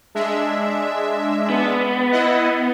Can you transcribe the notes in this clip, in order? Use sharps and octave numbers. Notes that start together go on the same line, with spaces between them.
G#3 D4 E5
B3
E4 D#5 F#5